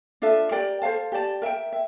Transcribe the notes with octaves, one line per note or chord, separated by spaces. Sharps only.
D4 F4 A4 E5
G4 A#4 D5 G5
A4 C5 F5 A5
G4 D5 A5
A#4 E5 G5
E5